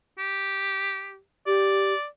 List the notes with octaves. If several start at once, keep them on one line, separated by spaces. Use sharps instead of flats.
G4
G4 D5